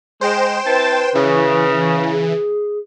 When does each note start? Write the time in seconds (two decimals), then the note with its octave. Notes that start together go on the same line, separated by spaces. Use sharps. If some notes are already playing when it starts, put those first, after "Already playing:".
0.21 G#3 C5 G5 E7
0.66 C4 E4 B4 A5
1.15 C#3 E3
2.11 G#4